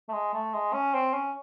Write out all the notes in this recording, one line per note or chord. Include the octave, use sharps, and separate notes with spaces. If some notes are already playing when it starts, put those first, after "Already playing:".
A3
G#3
A3
G#3
C#4
C4
C#4